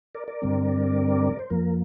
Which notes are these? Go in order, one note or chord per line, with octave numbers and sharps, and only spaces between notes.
A#4 D5
A#4 D5
G2 D3 G3 C4
C5
F2 F3 A#3 A#4